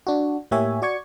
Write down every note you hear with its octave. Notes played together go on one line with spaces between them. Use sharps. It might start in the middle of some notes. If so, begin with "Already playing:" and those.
D4 F#4
A2 A#3 G4 C#5 E5 G#5
F#4 D5 C#6 G#6 C#7